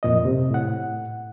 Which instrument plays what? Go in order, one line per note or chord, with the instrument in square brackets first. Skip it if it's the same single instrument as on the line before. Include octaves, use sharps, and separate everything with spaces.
[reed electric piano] F2 A#2 D#5
C3
A2 F#5